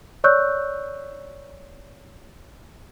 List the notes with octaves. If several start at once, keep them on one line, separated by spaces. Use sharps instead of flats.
C#5 D5 C#6 E6 F#6 G6